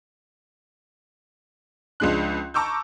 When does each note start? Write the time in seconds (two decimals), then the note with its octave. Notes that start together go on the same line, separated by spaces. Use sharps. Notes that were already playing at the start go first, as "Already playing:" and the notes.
2.00 C#2 F3 G#3 D4 F#6
2.54 A5 A#5 C#6 D6 E6 G6